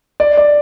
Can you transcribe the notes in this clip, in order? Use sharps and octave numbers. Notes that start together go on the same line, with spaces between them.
D5
D5